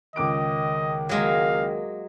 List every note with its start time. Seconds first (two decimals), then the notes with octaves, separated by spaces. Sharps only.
0.16 C#2 D#3 D#5 D6 D7
1.09 F#3 G#3 A#3 F5